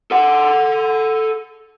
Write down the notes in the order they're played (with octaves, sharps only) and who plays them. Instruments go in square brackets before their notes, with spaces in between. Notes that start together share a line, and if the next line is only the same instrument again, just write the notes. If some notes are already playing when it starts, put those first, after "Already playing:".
[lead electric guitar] A4 F#5